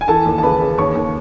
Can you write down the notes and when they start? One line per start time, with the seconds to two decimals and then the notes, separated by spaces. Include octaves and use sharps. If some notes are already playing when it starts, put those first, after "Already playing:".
0.01 G#5
0.08 E3 A4 A5
0.26 D#2
0.38 A5
0.43 C#3 B4 B5
0.61 C#3
0.78 D#2 C#5 C#6
0.95 D#2